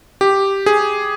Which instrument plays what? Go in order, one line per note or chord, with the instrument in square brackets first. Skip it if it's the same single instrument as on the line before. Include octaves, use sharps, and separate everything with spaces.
[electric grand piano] G4
G#4